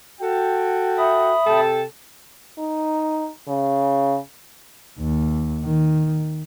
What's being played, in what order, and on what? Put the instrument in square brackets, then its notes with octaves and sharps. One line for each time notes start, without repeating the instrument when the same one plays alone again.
[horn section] F#4 A4 G5
[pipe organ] E5 B5 D#6
[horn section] C3 A4 G5
[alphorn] D#4
C#3
[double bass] D#2
D#3